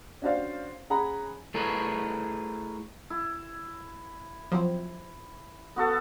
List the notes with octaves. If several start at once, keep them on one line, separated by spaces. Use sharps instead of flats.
C#4 D4 F#4 C5 D5 F5
C#4 G#4 F#5 G#5 A#5 B5
A3 E4 G#4 A#4 B4 C#5
E4
F3 F#3 C4
B3 F#4 A4